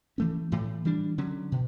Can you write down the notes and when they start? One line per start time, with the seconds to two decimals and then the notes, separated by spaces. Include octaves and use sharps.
0.18 E3 A3 C#4
0.52 A2 E3 A3
0.85 E3 G3 D4
1.18 D3 F#3 C#4
1.52 B2